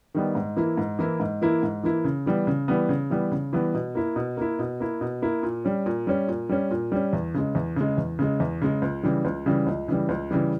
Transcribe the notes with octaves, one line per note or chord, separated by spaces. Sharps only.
D#3 G3 B3
G#2
E3 A#3 E4
G#2
E3 A#3 E4
G#2
E3 A#3 E4
G#2
E3 A#3 E4
C#3
E3 G3 B3
C#3
E3 G3 B3
C#3
E3 G3 B3
C#3
E3 G3 B3
B2
A#3 E4
B2
A#3 E4
B2
A#3 E4
B2
A#3 E4
A#2
G3 C#4
A#2
G3 C#4
A#2
G3 C#4
A#2
G3 C#4
E2
C#3 G#3
E2
C#3 G#3
E2
C#3 G#3
E2
C#3 G#3
C#2
C#3 E3 G3
C#2
C#3 E3 G3
C#2
C#3 E3 G3
C#2
C#3 E3 G3